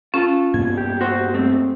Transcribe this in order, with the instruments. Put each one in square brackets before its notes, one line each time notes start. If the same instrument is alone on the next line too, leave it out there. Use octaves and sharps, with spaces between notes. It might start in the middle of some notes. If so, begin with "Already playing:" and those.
[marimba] C#4 [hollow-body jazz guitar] F4 A4
[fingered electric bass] G2 A#3 B3 [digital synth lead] G#6
[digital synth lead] G4
[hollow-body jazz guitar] F#4 C5
A3 C4